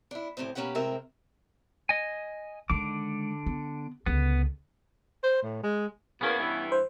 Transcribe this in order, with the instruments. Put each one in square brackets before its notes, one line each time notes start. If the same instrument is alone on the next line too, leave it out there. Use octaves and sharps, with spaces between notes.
[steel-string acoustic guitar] D4 E4
D2 A2 C3 C4 C5
B2 A#3 C#4 G4 B4 F#5
A2 C3 G#3 C4 A#4 E5
[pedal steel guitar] D#5 G#5
[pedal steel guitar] D3 D6 [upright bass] D#3 G#3
[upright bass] B3
[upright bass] C#2 D3 [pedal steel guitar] B3
[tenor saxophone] C5
A2
G#3
[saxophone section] E2 A#3 [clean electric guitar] B3 C#4
[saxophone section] G2 E3
[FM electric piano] C5